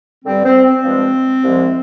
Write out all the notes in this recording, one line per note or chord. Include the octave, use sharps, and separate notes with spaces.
G2 D3 G3 C4
C4
C4
G2 F3 G#3
C2 C3 F3 G#3